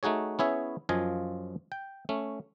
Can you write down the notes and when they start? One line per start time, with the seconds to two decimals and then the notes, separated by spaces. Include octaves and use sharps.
0.03 A3 D#4 F#4 G#4 C#5
0.39 B3 C#4 E4 G#4 C#5 E5
0.89 F#2 F3 F4 D#5 G#5
1.72 G5
2.09 A3 C#4